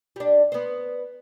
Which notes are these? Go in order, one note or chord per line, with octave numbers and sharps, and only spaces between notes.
G3 D4
B3 C5